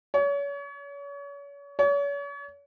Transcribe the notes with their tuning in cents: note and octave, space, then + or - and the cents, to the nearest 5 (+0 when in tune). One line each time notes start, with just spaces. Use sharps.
C#5 +35
C#5 +40